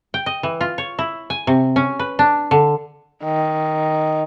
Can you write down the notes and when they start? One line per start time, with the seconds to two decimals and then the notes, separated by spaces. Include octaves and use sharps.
0.14 G5
0.26 D#5
0.43 E3
0.61 F4
0.78 C#5
0.99 E4
1.30 G#5
1.47 C3
1.76 C#4
1.99 B4
2.19 D4
2.51 D3
3.24 D#3